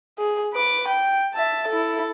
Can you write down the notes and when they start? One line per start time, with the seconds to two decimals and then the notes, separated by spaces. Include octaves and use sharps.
0.19 G#4
0.54 B4 D6
0.88 G5
1.34 E5 A5
1.69 E4 A4